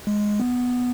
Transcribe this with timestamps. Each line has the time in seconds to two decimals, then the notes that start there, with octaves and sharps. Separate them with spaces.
0.07 G#3
0.40 B3